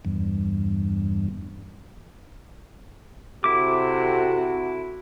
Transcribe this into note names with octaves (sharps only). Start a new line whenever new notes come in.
E2 G2
C3 E4 F#4 A4 D6